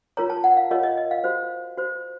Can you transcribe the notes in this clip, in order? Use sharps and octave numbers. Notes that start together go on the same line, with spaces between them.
F4 A#4 C#5 A#5
A5
F#5
F5
F4 A#4 C#5 D#5
D#5
D#5
F5
F#4 C5
F#4 C5